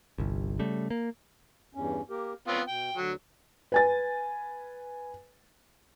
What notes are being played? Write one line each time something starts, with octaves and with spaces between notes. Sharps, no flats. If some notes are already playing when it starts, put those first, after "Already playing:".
G1 C2
C#3 G3 A3
A#3
E2 G2 C#4
A#3 G4 A#4
B3 C4 F4 C#5
B2 G5
D2 D3 F#3
B4 G#5 A6